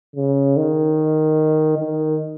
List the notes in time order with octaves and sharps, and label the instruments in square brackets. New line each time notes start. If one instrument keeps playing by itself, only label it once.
[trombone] C#3
D#3
D#3